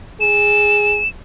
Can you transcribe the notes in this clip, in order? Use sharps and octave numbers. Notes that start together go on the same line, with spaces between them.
G#4 E7